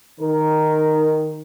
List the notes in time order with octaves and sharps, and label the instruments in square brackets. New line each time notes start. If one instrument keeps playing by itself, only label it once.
[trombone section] D#3 A#4